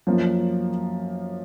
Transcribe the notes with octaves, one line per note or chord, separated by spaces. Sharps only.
F#2 F3 A#3